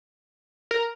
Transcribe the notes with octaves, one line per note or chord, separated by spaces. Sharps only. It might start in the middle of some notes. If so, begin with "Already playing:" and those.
A#4